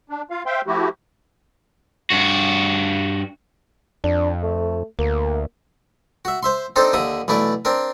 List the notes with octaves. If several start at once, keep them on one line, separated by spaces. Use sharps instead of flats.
D4
F4 F5
C5 E5 F5 G5 C6
F3 A3 E4 F#4 G4
G2 F#4
F2 D4
A3
D2 A#3
F#4 E5
C5 E5 C6
C4 D4 D#4 A4 C5
D#2 D3 E5 D#6
B1 E3 A3 E4 D5
C4 D4 A#4